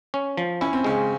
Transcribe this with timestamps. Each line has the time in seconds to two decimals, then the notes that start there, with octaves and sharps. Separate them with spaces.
0.14 C#4
0.37 F3
0.61 C#4 E4
0.73 C4
0.84 C#3 G#3 C#4